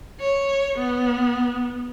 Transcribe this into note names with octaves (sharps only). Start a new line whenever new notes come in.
C#5
B3